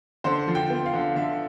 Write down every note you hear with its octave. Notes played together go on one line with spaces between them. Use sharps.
D3 C5
F3
G5
B3
F5
D3
D3 E5